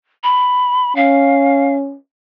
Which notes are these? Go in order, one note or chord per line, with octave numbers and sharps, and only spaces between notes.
B5
C#4 F5